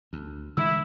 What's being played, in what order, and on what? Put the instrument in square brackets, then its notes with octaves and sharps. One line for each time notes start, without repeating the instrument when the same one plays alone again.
[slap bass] D2
[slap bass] D3 E3 G#3 [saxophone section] E4 [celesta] E6